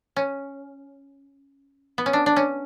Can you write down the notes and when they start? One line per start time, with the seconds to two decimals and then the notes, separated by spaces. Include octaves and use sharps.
0.16 C#4
1.98 B3
2.06 C#4
2.13 D4
2.26 D4
2.36 C#4